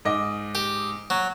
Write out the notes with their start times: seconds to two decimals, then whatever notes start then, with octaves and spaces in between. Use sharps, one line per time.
0.05 G#2 D#5 D6
0.55 G4
1.10 F#3